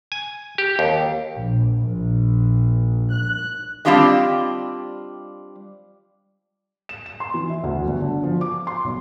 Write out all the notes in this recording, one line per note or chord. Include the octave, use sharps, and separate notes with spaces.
G#5
G4
D#2
A#1
A#1
F#6
G3 C4 D4 F4 G4 D#5
E7
E7
C6
E3
E5
D2
G1
D3
F3
D6
C6
B1